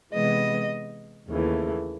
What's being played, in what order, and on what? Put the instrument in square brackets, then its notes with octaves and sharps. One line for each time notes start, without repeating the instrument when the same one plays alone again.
[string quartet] C3 E3 G#3 B3 D#5
D#2 C#3 E3 A3